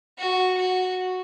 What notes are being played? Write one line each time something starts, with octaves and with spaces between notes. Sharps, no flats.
F#4
F#4